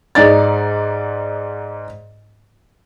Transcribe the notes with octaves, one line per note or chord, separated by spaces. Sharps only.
G#2 D#4 D5 A6